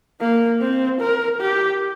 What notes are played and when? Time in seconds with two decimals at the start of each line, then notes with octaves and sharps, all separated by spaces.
0.20 A#3
0.61 C4
1.01 A#4
1.41 G4